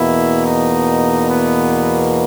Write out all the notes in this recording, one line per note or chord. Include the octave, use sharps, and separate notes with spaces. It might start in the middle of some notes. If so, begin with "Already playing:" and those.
Already playing: E2 B2 A#3 E4
D#4
B3